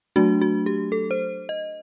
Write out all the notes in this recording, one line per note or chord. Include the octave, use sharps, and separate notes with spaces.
F#3 A3 D4 F#4
F#4
G4
A4
C5
D#5